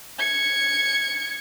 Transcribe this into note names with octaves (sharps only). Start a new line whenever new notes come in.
G#6 C#7